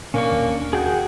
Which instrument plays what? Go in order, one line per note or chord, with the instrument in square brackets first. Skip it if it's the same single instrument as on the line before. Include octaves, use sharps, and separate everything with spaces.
[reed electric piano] A#2 [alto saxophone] A#3 [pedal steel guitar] C#4 D4 C#6
[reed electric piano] D#2
[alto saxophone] F#4 [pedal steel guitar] G#4 G5 G6